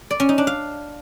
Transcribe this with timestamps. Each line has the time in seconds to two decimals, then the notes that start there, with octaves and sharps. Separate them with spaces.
0.11 D5
0.20 C#4
0.29 D#4
0.38 D4
0.47 F5